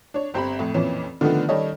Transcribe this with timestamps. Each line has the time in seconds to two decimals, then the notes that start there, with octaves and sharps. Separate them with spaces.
0.14 D4 C#5
0.34 G1 C4 G4 A#5 B5
0.59 F2 A2
0.74 F2 A#2 E3 C#4 E7
1.21 D3 D#3 F3 A3 B3
1.49 D#3 G3 C#4 A4 C#5 D#5